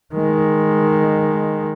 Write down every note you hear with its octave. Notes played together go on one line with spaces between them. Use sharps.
D#3 G#3